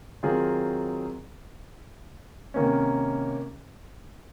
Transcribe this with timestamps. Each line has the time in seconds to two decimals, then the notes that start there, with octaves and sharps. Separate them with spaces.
0.23 D#3 F#3 C4 F4 G#4
2.54 C3 D#3 A#3 C#4